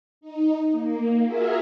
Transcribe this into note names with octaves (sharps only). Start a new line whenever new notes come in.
D#4
A#3
F4 F#4 G#4 A#4 E5